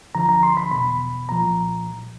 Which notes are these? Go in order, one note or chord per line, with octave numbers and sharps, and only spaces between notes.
D2 D3 F3 A#5
A#5
C6
B5
E2 B2 B5
C2 A#2 F3 A#5